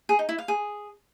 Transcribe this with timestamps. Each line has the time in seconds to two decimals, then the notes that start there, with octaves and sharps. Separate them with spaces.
0.09 G#4
0.19 D#4
0.29 E4
0.38 F5
0.48 G#4